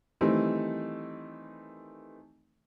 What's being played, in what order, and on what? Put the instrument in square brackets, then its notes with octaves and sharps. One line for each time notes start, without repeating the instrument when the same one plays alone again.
[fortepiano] D#3 E3 G3 A3 C4 D#4